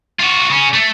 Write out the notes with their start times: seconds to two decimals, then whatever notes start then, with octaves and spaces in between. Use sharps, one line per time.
0.20 F4 F#4
0.50 C#3 C#4
0.74 A3